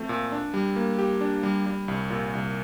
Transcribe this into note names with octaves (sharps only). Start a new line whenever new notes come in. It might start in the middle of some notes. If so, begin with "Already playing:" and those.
Already playing: F3 A3 C4
A#2
D4
G3
A#3
G4
D4
G3
G3
C2
A#2
C2